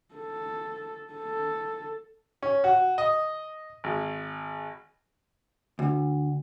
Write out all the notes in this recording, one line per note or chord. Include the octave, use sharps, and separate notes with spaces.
A4
A4
C#4
F#4
D#5
G#1
D2